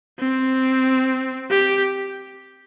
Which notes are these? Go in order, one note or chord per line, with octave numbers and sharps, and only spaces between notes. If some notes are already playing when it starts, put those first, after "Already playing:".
C4
G4